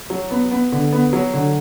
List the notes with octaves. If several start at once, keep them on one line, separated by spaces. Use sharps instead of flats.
F#3
B3
B3
D3
B3
F#3
D3